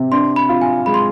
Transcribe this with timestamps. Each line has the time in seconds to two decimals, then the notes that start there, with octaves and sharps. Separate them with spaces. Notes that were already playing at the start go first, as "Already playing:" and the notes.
Already playing: C3
0.12 D4 C6
0.36 B5
0.49 F4
0.62 G#5
0.86 G#3 B5
0.94 C6